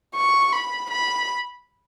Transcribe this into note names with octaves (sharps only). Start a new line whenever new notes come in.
C#6
B5
B5